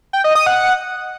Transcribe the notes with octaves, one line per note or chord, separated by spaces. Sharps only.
G5
D#5
D#6
F#5